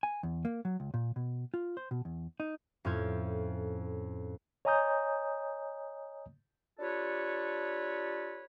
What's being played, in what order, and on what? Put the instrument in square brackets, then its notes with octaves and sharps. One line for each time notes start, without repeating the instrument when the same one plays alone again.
[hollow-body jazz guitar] G#5
E2
A#3
F#3
C#2
A#2
B2
F4
C5
B2
E2
D#4
[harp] F2 A2 C#4 F4 G6 G#6
[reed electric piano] C#5 D#5 G#5 A#5 D#6 G6
[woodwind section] D4 F4 G4 A4 B4 C#5